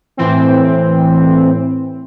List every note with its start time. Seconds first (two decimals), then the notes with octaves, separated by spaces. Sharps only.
0.17 A2 E3 C4